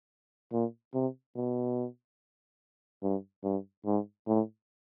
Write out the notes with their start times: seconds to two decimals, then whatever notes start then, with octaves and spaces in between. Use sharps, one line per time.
0.52 A#2
0.94 C3
1.36 B2
3.02 G2
3.44 G2
3.86 G#2
4.27 A2